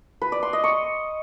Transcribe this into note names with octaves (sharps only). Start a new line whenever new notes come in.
B4
D5
C6
D#5
C#6